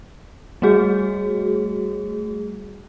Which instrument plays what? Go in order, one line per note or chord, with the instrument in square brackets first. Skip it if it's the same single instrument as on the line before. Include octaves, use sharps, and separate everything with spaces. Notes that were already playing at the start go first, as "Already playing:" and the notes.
[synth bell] G3 A3 F#4 G#4